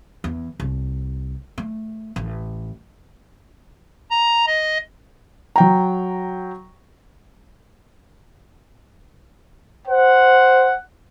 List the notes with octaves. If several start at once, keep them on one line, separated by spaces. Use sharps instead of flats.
E2
C2
A3
A1
A#5
D#5
F#3 G5 A#5
C5 F#5